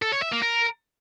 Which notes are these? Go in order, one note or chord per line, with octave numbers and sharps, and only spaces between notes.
A4
C#5
E5
A#3
A#4